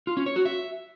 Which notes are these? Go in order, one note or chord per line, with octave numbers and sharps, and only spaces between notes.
F4
C#4
C#5
F#4
E5